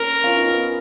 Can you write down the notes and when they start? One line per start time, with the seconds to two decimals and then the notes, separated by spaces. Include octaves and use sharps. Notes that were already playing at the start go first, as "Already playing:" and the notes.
Already playing: A#3 C#4 A#4
0.23 C#4 F4
0.37 B3 D#4
0.51 B3